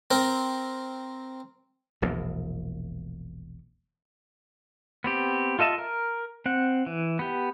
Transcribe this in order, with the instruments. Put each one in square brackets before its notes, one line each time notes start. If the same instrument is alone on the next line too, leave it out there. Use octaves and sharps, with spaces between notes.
[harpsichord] C4 A#4
[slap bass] E1 A#1 E2
[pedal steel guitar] B3 C4 G4
F4 A4 D#5 E5 A5
A#4
C4 F#5
E3
B3 G4